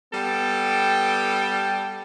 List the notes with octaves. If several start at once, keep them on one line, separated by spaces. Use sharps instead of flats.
G3 B3 A4 G5